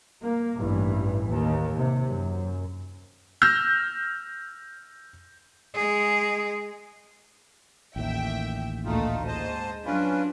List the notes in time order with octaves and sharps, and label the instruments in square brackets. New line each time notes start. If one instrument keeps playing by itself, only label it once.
[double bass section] A#3
A1 G2 E3
D#2
C3
F#2
[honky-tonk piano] E6 F6 G6 A#6
[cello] G#3 G#4
[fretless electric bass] A1 D#2 [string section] E5 G5
[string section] D2 A#2 A3 [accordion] D#4 F4
[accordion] G#2 C5 A5 [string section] G#3 D#5
[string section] F#3 [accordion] C#4 F4 B4 [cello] D4